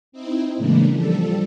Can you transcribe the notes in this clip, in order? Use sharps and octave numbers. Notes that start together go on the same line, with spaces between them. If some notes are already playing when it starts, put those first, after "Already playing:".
C4 D#4 E4
A2 C#3 E3 G#3 A#3 D4
F3 G3 A4